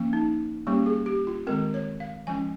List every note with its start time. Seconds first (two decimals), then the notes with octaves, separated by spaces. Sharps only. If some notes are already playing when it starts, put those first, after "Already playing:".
Already playing: F3 A#3 C#4
0.13 D#4
0.67 G3 A#3 C#4 G4
0.86 G#4
1.06 G4
1.27 F4
1.47 D#3 G#3 C4 A#4
1.74 C#5
2.00 F5
2.27 F3 G#3 C#4 G#5